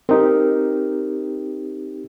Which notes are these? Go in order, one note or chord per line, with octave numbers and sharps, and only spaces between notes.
C4 D#4 G4 A#4